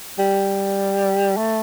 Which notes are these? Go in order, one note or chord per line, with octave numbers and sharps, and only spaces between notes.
G3
A3